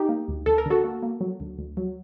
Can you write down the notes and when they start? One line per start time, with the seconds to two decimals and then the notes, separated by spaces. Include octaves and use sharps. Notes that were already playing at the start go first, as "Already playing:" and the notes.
Already playing: D#4 G4
0.09 A#3
0.28 D2
0.46 D2 A4
0.58 A#4
0.66 D3 F#4 A4
0.84 A#3
1.03 A#3
1.21 F#3
1.40 D2
1.58 D2
1.77 F#3